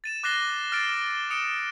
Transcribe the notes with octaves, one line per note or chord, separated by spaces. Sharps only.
A6 D#7 E7
D6 F#6 A6 A#6 C7 G7
E6 F6 A6 C7 D7 E7
D#6 C#7 D7 E7